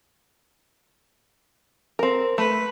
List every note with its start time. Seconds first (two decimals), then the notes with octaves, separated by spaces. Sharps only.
1.99 C4 A#4
2.38 A3 B4